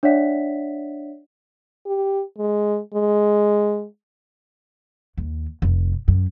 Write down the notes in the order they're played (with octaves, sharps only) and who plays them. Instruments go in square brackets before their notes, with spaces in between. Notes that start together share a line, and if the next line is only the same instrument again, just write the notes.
[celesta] D4 C#5 D5 E5 F#5 B6
[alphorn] G4
G#3
G#3
[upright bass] D#2
F1
F#2